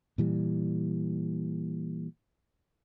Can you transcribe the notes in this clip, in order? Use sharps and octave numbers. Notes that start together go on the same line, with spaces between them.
A#2 E3 G3